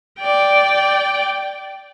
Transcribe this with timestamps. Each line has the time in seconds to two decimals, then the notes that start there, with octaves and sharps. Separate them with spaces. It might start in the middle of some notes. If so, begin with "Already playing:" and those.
0.21 D5 G5